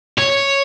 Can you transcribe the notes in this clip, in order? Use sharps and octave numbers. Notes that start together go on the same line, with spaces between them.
C#5